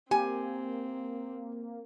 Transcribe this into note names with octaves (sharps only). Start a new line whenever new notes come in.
A#3 C4 G4 G#5